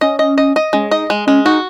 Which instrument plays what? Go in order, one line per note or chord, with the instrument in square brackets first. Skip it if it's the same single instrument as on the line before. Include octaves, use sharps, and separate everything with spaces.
[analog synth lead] C#4 [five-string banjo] D#5
[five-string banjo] D#5
D#5
D#5
[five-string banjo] G#3 [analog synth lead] C#4
[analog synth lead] D#4 [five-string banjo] D#5
[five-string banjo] G#3
[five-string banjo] G#3 [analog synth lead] C#4
[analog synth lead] D#4 [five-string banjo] F#4